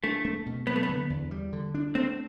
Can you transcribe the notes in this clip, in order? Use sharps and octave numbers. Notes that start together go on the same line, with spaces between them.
A3 D4
A3
B2
F#3 B3
A3
B3
D3
E2
G3
D3
D4
A3 C4